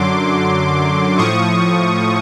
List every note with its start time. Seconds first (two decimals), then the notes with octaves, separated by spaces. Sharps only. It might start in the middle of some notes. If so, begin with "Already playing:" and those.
Already playing: F#2 D3 F#3 C6 D6
1.17 A2 F3 C#6 D#6